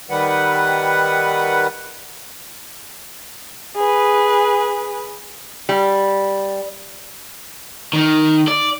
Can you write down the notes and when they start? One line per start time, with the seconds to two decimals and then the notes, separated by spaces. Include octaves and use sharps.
0.10 D#3 G3 B4 F#5
3.76 G#4 B4
5.69 G3
7.93 D#3
8.48 D5